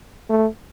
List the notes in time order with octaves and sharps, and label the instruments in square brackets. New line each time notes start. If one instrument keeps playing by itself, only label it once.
[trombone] A3